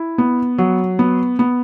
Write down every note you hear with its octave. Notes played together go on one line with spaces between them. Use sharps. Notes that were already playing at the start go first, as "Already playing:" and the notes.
Already playing: E4
B3
F#3
B3
B3